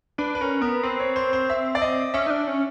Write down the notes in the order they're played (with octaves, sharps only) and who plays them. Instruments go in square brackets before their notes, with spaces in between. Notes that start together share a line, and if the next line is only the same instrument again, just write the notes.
[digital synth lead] D4 [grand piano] B4
[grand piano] B4
[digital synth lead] C#4 [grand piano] A#4
[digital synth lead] B3 [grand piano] A#4
[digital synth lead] C4 [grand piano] B4
[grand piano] C#5
C5
C5
E5
D5
D#5
[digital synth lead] C#4 [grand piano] E5
[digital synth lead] D#4
D4
C#4